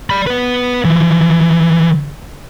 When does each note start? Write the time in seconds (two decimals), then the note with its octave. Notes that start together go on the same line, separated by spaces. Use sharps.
0.10 D5 B5
0.27 B3 B4
0.85 E3 F3